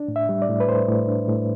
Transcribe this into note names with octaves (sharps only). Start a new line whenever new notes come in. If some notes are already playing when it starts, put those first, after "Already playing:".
Already playing: D4
A2
E5
G3
D5
A2
B4
A2 C5
A2
D4
A2